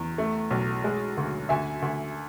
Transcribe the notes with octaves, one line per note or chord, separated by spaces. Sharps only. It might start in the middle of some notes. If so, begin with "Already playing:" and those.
Already playing: E2
A3
B1
G#3
D2
D2 E5 G#5
D2